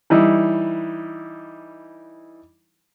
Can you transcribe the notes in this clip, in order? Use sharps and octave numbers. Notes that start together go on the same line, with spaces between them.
E3 G3 D#4 E4